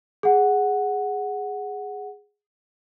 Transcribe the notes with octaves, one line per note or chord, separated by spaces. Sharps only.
G#4 F#5